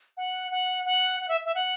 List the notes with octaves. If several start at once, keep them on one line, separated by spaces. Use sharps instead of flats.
F#5
F#5
F#5
F#5
E5
E5
F#5